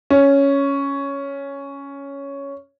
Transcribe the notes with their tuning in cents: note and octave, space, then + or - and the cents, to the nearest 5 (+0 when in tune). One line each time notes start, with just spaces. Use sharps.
C#4 +5